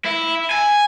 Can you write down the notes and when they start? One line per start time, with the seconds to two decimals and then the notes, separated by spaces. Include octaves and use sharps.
0.06 E4
0.51 G#5